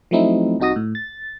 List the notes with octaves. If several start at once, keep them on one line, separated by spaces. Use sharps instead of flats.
F3 F#3 A3 C4 D#4 E4
C2 C3 D#4 F#4 D#6 A#6
A2
A6